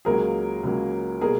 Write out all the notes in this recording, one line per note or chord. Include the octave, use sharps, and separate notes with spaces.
C#2 C#3 F#3 A#3 G#4 A#4
C#2 C#3 F#3 A#3
B2 G3 A#3 G#4 A#4